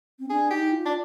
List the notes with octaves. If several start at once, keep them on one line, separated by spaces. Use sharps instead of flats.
C4
D4 G#4
D#4 G4
F4
D4